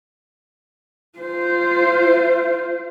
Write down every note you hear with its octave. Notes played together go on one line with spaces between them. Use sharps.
F4 C5